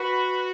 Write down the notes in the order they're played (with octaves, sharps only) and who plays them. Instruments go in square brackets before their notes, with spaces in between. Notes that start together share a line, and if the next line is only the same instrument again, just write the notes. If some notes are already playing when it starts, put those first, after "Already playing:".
Already playing: [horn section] F#4 [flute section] B4